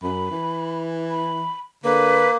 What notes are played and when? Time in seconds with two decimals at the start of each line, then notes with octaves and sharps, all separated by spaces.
0.03 F#2 B5
0.32 E3
1.10 B5
1.84 D3 A#3 B4